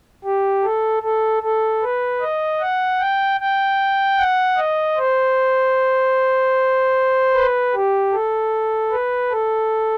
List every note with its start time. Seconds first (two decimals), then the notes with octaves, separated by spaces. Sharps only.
0.24 G4
0.64 A4
1.03 A4
1.43 A4
1.83 B4
2.21 D#5
2.61 F#5
3.00 G5
3.40 G5
4.19 F#5
4.58 D#5
4.98 C5
7.34 B4
7.74 G4
8.13 A4
8.91 B4
9.32 A4